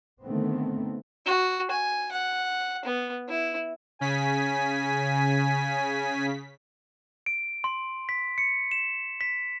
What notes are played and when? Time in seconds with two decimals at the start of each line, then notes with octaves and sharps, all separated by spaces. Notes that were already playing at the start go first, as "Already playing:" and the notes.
0.21 D3 D#3 A3 B3 C4
1.26 F#4
1.71 G#5
2.12 F#5
2.85 B3
3.28 E4
4.01 C#3 G#5 B6
7.26 D7
7.64 C6
8.09 B6
8.38 C#7
8.71 E7
9.21 B6